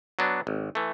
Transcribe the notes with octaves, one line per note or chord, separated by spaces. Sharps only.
F#3 B3 D4
G#1
E3 A3